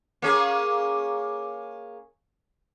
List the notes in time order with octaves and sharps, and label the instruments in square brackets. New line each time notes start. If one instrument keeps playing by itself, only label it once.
[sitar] A#3 C#4 G#4